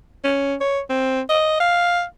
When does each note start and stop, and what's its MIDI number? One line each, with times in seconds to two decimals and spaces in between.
0.24 0.55 61
0.61 0.80 73
0.90 1.21 60
1.29 1.57 75
1.60 2.03 77